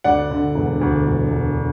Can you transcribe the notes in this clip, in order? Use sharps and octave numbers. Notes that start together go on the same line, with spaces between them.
D2 D5 F#5
D3
E1
D2
E1
E1